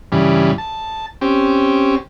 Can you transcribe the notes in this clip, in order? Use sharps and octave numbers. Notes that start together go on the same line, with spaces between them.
G2 C#3 E3 G3
A5
C4 C#4 G4